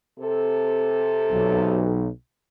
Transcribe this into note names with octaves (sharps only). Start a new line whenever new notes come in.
C3 A4
B1